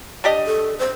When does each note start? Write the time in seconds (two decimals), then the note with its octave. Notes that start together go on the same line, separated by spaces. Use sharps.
0.24 D4 G4 D#5
0.46 A4
0.79 C5